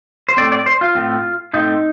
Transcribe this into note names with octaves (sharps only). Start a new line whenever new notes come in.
C5
A2 A3 C4 D5
D5
C5
F4
A2 A3 C4
A2 A3 C4 D#4